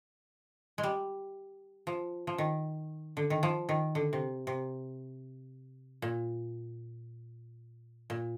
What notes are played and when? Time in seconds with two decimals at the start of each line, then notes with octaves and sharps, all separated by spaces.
0.78 G#3
0.83 G3
1.87 F3
2.27 F3
2.38 D#3
3.17 D3
3.30 D#3
3.43 F3
3.69 D#3
3.95 D3
4.13 C3
4.47 C3
6.02 A#2
8.10 A#2